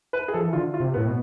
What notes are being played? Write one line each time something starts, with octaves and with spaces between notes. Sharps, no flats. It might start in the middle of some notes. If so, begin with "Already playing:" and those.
B4
G#4
F3 A4
E3
D3 F4
F4
C3
B3
A2
B2